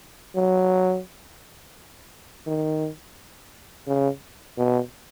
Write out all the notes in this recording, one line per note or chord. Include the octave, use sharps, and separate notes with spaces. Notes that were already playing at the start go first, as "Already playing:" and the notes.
F#3
D#3
C#3
B2